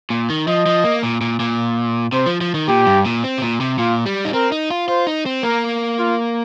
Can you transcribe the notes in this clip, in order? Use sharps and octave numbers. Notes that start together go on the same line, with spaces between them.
A#2
D#3
F3 D#5
F3
A#3
A#2
A#2
A#2
C3 C5
F3
F3
D#3
A#2 G4
G2
A#2
C4
C3
A#2
C3
A#2 F4
G3
D#4
C4 A#4
D#4
F4
F4 C5
D#4
C4
A#3 A#4
F4